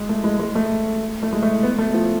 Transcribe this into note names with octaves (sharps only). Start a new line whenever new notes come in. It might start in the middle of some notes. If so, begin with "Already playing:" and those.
Already playing: G#3
A3
G#3
G#3
A3
A3
G#3
A3
B3
A3
F3